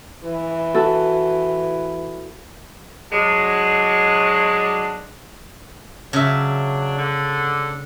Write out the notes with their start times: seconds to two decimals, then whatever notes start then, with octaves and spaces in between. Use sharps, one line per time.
0.24 E3
0.74 E4 F#4 A4
3.12 F#3 G#3 D4
6.13 C#3 F#3 D4 E5
6.97 D3